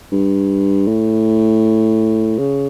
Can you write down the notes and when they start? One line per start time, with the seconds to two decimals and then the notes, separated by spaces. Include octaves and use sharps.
0.12 G2
0.87 A2
2.38 C#3